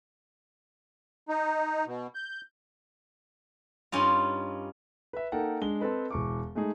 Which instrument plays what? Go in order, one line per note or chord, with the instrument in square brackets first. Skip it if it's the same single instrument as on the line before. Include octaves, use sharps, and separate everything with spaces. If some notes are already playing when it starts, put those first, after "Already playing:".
[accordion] D#4
B2
G6
[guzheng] G2 C#4 D#4 F4
[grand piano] B4 E5
A#3 D#4 A4 A#4 F#5 G5
G#3 D4 G7
C4 A4 B4 D#5
E1 C#6 D6
G#3 A3 D#4 G#4